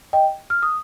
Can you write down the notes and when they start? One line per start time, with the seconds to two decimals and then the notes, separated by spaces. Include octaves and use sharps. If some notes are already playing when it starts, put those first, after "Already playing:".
0.13 D#5 G5
0.50 F6
0.63 D#6